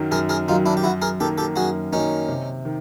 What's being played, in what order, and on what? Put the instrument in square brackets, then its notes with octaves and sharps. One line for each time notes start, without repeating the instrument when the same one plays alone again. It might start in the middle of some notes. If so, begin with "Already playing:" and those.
Already playing: [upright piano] F#2 D#3 F#3
[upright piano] F#2 [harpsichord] G#4 A#4
[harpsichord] G#4 A#4
[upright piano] D#3 [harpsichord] D#4 F4
[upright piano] F#3
[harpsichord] D4 E4
G4
[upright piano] F#2 [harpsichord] E4 F#4
[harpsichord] G#4 A#4
[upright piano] D#3 F#3 A#3 [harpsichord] G4 A4
[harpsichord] G4 A4
[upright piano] F#2 [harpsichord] F#4 G#4
[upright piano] D#3 F#3 A#3 [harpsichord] C#4 D#4
[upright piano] C3
D#3